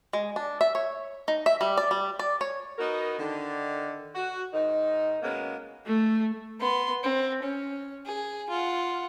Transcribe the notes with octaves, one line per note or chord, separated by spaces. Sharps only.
G#3
D4
E5
C#5
D#4
E5
G3
D5
G3
D5
C#5
B3 D#4 F#4 A#4
D3 D#3
F#4
G#2 D#3 D#4
B2 G#3 A#3 B3 C#4
A3
B3 C6
C4
C#4
G#4
F4 F#5